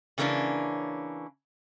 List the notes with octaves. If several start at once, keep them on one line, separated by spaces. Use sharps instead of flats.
C#3 E3 A#3 C#4 D4